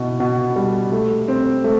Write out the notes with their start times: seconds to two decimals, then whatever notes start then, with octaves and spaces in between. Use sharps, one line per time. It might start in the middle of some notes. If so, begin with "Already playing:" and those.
Already playing: B2 E4
0.20 B2
0.56 G3
0.92 A3
1.28 C4
1.64 A3